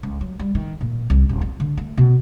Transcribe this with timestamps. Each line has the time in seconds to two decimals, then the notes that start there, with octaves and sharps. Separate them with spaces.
0.03 C#2
0.21 F#3
0.39 G3
0.55 D#3
0.81 A#2
1.10 C2
1.29 D#1
1.41 F2
1.60 D3
1.77 A3
1.97 B2